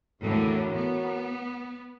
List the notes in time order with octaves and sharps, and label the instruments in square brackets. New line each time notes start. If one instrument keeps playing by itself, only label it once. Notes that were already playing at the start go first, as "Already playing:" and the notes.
[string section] E2 A2 D3 [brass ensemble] F#4 A#4 C#5
[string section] B3